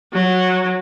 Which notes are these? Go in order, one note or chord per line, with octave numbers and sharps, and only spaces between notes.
F#3